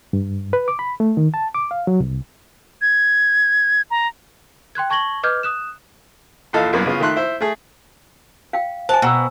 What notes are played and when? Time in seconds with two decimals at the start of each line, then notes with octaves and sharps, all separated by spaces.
0.13 G2
0.53 B4
0.68 D6
0.79 B5
1.00 A3
1.17 D#3
1.34 A5
1.55 D6
1.71 F5
1.87 F#3
2.00 C2
2.82 G#6
3.91 A#5
4.75 G5 C6 F#6 G#6
4.90 A5 C#6 G#6 A#6 F#7 G7
5.23 B4 D#5 D6 F6 G6 G#6
5.43 D#6 F#6 E7
6.53 A#1 E2 A4 D#5 F5
6.73 C2 F#2 A#3 B3
6.86 C#3 B3 F4
7.00 D#3 A3 E5 C6 F#6
7.16 E4 C5 E5
7.41 A3 G#4
8.53 F5 G5
8.89 C5 G#5 A5
9.02 B2 G5 A#5 E6